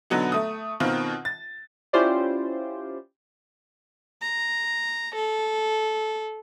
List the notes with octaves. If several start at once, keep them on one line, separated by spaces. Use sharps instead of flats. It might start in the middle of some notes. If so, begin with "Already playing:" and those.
B2 D3 F#3 B3 D#4
A3 D#6
B2 D#3 C4 F4
A6
C#4 E4 F4 G4 C5 D5
A#5
A4